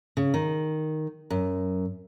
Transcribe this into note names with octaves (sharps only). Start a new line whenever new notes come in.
C#3
D#3
F#2